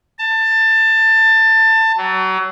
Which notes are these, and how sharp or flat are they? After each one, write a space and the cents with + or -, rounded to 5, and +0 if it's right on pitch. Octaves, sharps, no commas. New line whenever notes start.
A5 +20
F#3 +30